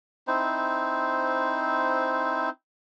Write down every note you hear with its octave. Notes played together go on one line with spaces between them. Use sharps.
C4 D#4 E4 C5